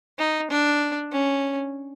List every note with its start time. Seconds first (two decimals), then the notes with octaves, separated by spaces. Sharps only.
0.19 D#4
0.51 D4
1.12 C#4